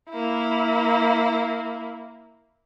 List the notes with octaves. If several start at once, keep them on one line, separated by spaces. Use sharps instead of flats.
A#3 E4